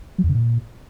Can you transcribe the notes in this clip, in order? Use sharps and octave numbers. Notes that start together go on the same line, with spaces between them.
F#3
E2
C#3
A#2